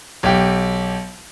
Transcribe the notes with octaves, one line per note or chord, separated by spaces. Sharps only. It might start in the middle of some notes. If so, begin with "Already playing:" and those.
B1 G4